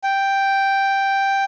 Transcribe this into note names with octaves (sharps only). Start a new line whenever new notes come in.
G5